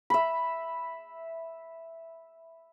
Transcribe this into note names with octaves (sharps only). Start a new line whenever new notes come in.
E5 B5